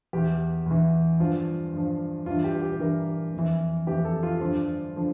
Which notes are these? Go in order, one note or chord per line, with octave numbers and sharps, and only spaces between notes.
E2 E3 G4
E2 E3
G2 F3 F4
G2 F3
G2 E3 F4
G4
G4
G2 E3 A#4
F2 E3
F2 E3 G4
A4
F4
G2 D3 F3 F4
D3 F3